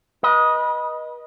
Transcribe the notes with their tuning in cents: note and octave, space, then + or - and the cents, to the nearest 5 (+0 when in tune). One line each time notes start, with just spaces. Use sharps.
B4 -35 D#5 +0